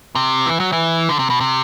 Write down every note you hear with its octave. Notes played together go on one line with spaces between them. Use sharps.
C3
E3
F#3
E3
D3
C3
B2
C3